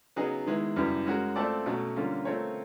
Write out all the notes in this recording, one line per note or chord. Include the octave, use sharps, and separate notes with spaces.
C#3 F#3 B3 D#4 G#4
D#3 G#3 B3 E4
F#2 C#3 E3 G3 B3
G#3 C#4 F#4 A#4
A3 C4 F4 A4 D5
B2 F#3 A3 C#4
D3 G3 A#3 C#4 F4
A3 C4 F4 A#4 C#5